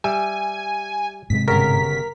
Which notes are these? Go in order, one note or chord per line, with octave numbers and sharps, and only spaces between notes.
G3 E5 G#5
G#2 C3 G#3 B6
G1 C#3 A#4 B6